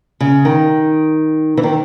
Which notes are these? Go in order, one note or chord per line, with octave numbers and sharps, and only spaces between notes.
C#3
D#3
E3
D#3